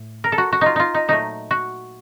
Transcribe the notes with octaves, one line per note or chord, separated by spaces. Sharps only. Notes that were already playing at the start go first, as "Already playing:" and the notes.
Already playing: A2
A#4
A4
F#4
F#4
D#4 F4
D#4 F4
D#4
A#2 F#3 A3 D#4
F#4